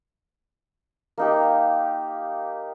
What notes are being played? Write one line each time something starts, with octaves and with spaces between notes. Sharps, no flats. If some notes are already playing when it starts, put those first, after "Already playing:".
A#3 D#4 G4